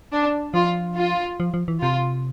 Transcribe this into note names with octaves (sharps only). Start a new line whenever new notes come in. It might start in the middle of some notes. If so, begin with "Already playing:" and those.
D4
F3 F4
F4
F3
F3
E3
C3 F4